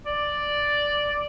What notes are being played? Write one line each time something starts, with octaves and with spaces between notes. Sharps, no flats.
D5